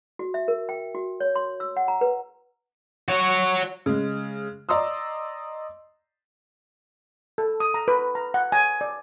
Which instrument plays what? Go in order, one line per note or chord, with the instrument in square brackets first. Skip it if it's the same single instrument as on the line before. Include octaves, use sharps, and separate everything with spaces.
[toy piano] F#4
E5
A#4
G5
F#4
C#5
C6
E6
F#5
A#5
B4
[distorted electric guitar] F#4 C#5
[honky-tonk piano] C#3 G#3
D5 D#5 A#5 C6 D#6 E6
[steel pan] A4
D#6
A#5
B4
A#5
F#5
G#5
D5